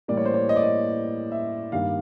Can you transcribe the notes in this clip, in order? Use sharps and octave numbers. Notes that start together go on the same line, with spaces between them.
A2 E3 G3 A#3 D5
C#5
C5
C#5
D#5
D5
D#5
E5
G2 D#3 G3 A#3 F5